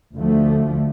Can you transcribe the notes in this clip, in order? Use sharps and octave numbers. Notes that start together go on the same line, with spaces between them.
D2 D3 F3 A3